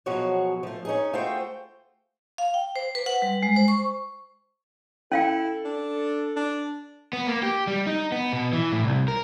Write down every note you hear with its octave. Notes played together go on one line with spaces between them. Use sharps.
B2 F3 F#3 C#4 F#4 G#4
F3 A3
C#4 D#4 G#4
A3 F4 F#4 G#4 C5 G5
F5
G5
C5
B4
F#5
G3
G#3
C5
C#6
C#4 E4 A4 F5 G5
D4
D4
B3
A#3
G4
G3
D#4
B3
B2
E3
A2
C2
A#4